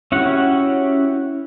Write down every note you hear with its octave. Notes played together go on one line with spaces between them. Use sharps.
C#4 E4 F#4 G4 F#5